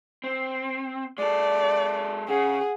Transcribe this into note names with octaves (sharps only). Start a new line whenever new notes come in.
C4
G#3 A4 D5
C#3 G#4 F#5